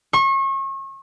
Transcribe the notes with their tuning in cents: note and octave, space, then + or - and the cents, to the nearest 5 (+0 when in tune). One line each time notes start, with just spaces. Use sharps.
C#6 -35